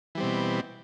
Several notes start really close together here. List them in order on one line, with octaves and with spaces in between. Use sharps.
E3 G3 C4 B2